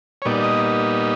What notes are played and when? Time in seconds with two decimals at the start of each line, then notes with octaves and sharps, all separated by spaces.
0.22 C#5
0.25 A#2 G3 B3 D#4 D5
0.43 D#5